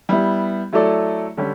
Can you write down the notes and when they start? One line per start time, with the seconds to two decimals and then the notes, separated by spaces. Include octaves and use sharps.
0.09 G3 B3 E4
0.73 F#3 A3 E4 A4 D5
1.37 D3 G3 C#4 G4